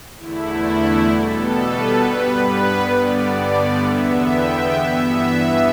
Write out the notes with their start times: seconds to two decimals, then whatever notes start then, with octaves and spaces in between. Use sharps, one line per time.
0.18 E2 D3 A3 E4
1.10 B2 G3 B3 A4
1.56 B4
2.01 G2 G3 B3 B4
2.92 G2 D3 G3 B3 D5
3.83 E2 D3 B3 E5
4.29 G5
4.74 G2 E3 B3 E5
5.20 E5